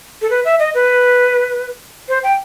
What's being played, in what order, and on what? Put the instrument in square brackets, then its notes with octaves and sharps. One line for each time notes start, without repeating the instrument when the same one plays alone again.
[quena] A4
B4
E5
D#5
B4
C5
G5